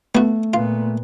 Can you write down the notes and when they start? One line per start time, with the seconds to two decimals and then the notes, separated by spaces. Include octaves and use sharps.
0.15 A3 B3 F#4
0.54 A#2 B3 F4